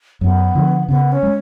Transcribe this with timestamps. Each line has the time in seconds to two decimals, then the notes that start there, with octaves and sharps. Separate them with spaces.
0.21 F#2 B3
0.55 D3 F3
0.88 C#3 B3
1.12 C#4
1.23 G#3